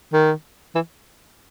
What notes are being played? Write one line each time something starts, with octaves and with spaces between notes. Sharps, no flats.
D#3
E3